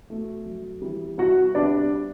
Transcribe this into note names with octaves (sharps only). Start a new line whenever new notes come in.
B2 A3
F#2
E3 G3
C2 F#4 F#5
C3 G3 B3 D4 D5